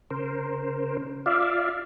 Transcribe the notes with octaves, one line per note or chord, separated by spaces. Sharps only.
C#3 A#4 C5
F4 D5 E5 F5